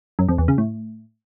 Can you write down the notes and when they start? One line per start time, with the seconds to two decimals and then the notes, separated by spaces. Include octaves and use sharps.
0.19 F#2
0.29 F2
0.38 E2
0.48 C#3
0.58 A2